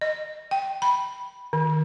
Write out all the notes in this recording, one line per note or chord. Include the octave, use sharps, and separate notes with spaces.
D#5
G5
B5
D#3